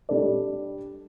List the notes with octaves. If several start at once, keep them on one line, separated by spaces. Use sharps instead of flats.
G3 D4 A4 D5